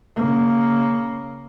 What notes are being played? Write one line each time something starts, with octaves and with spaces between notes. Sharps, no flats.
C#3 A#3